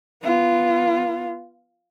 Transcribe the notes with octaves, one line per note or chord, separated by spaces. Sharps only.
B3 F4